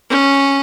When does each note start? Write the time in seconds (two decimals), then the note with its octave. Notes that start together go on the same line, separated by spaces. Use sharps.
0.09 C#4